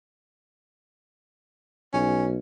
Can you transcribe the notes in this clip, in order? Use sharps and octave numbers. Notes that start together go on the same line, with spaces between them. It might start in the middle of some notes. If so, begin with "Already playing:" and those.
B1 C#4